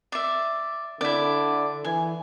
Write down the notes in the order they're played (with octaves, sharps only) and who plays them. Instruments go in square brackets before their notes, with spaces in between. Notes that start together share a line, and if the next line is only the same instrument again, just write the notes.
[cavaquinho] D5 E5
[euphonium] D3 [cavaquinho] E4 D5
[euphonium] E3 [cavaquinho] G#5